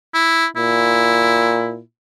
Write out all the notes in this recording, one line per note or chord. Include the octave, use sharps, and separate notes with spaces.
E4
A#2 E4